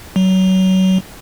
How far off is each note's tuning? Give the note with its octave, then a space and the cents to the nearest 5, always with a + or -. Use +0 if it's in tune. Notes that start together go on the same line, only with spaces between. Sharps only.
F#3 +25